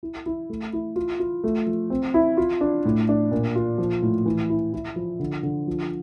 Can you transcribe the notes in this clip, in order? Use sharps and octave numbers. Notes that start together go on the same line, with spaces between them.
E4
E4
A3
E4
F4
F4
A3
F3
C4
E4
F4
D4
A2
D4
A#2
F4
F3
A2
E3
E4
E4
F3
D3
D3
F3